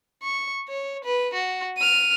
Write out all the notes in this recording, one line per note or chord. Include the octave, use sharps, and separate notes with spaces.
C#6
C#5
B4
F#4
F6 D#7